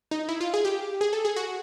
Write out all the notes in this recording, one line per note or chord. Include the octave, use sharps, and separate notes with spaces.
D#4
E4
F4
G#4
G4
G#4
A4
G#4
F#4